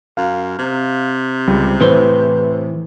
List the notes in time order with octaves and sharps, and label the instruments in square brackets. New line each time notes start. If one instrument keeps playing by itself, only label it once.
[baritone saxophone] F#2 [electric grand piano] F5
[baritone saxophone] C3
[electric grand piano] C#2 G3
[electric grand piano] A2 [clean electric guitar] E3 E4 C6 [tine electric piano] B4 C5